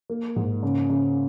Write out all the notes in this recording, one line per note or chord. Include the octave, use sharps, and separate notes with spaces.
A#3
G#2
C#3
C#3